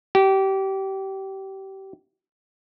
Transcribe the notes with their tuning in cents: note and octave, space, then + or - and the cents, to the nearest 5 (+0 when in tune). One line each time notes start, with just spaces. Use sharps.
G4 -25